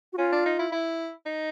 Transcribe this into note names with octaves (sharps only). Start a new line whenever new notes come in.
F#4
C#4 F4
D4
D#4
E4
E4
D#4